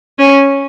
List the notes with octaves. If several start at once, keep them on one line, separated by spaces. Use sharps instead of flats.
C#4